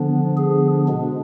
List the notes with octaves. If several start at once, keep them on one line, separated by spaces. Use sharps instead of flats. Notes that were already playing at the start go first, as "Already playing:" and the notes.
Already playing: D3 F3 B3 D4
G#4
B2 G#3 D4